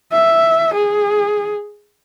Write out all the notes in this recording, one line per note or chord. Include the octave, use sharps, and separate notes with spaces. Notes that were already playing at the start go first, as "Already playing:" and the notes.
E5
G#4